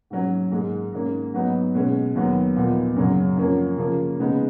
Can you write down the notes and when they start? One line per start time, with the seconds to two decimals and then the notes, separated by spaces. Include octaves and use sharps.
0.10 G#2 F#3 C#4
0.51 G#2 D#3 G#3
0.92 G#2 D#3 A#3 C#4
1.33 G#2 F#3 B3 D#4
1.74 B2 G#3 C#4
2.15 D#2 D#3 F#3 B3
2.56 A#2 F3 B3 D#4
2.96 F#2 C#3 F#3 C#4
3.37 F#2 F3 A#3 C#4
3.78 C#3 F3 A#3
4.20 C#3 G#3 B3 D#4